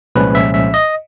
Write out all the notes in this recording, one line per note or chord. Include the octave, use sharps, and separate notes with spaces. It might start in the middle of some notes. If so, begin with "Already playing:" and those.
C2 A#2 F3 G#3 C#4 B4
E5
E5
D#5